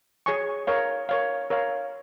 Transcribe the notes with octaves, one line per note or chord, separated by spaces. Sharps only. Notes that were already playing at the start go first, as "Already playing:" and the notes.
G#4 C#5 G#5 C#6
A#4 C#5 F5
A#4 C#5 F5
A#4 C#5 F5